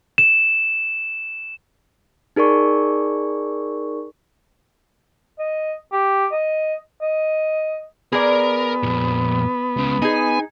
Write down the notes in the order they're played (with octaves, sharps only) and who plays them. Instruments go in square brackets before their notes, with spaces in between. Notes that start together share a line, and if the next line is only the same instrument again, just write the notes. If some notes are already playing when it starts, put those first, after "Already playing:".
[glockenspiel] E7
[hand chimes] D#4 G#4 A#4 D5 C#6
[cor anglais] D#5
G4
D#5
D#5
[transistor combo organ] B3 [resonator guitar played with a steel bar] G#4 D5 [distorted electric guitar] A#4 A#5
[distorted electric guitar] F2 A#2
C#2 C#3
[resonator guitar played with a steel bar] D#4 G#4 [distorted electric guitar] G#5